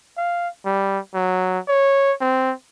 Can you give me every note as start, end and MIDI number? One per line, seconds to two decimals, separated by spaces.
0.17 0.48 77
0.66 0.99 55
1.14 1.59 54
1.68 2.13 73
2.21 2.52 60